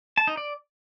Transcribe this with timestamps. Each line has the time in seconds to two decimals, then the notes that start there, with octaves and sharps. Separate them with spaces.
0.17 A5
0.27 D#4
0.37 D5